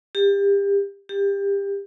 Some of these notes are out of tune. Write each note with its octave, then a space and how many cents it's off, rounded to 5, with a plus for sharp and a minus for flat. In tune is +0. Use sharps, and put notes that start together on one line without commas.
G4 +30
G4 +25